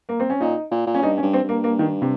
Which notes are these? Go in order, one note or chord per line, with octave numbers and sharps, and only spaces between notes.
A#3
C4
C#4
A#2 D#4
A#2
A#2
C#4
G2 D#4
C#4
G2
C4
G2
A#3
A#3
D#3
C3